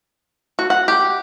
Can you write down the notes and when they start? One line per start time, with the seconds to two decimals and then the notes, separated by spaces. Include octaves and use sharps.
0.59 F#4
0.70 F#5
0.88 G4